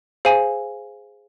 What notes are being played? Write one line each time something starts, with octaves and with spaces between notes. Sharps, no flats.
G#4 C5 F5 G#5